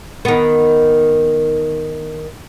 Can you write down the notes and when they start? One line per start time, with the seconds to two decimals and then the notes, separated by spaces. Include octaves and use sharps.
0.25 D#3 B3